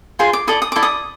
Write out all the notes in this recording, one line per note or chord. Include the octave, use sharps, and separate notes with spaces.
F4 G#4 C5 C6
D6
E4 A4 D5 D#6
D#6
E4 A4 D5 D6
D#6